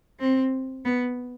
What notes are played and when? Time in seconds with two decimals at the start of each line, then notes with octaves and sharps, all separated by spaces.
0.20 C4
0.85 B3